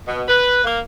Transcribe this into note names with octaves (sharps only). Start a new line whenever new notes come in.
B2
B4
A#3